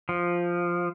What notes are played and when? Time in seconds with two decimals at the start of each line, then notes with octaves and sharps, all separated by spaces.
0.09 F3